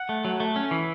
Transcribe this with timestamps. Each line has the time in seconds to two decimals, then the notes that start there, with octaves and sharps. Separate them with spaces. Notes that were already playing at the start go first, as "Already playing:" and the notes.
Already playing: F#5
0.09 A3
0.25 F#3
0.40 A3
0.56 C#4
0.71 E3